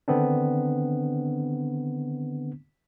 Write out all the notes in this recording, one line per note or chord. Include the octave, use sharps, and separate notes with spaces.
D3 D#3 B3 C4 D4